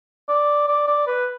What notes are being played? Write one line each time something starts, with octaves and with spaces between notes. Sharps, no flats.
D5
D5
D5
B4